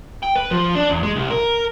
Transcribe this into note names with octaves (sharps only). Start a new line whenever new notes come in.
G5
B4
F3
D4
E2
G#3
C2
A#4